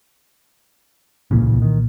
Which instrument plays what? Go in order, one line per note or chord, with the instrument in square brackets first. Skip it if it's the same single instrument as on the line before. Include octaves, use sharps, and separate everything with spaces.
[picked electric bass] D1 C#3 [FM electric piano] C2 A#2 E3
[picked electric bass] D#3